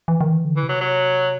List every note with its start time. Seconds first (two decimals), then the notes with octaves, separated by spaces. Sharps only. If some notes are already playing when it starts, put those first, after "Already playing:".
0.08 E3
0.21 D#3
0.32 E3
0.45 D3
0.57 E3
0.63 C3
0.69 F#3
0.81 F#3